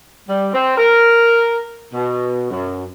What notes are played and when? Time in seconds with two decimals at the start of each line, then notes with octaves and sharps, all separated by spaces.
0.28 G3
0.53 C4
0.78 A#4
1.94 B2
2.51 F#2